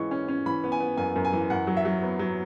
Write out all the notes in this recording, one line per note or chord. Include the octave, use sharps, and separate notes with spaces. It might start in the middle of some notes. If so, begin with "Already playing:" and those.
Already playing: E3 G#3 C#4 C#6
C#4
C#4
E3 B5
B3
G#5
B3
F#2 G#5
F#2
G#5
E3
F#2 F#5
F#3
E5
F#3
B3
F#3